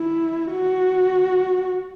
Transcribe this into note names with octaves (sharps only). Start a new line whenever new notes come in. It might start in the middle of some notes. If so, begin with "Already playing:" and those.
Already playing: E4
F#4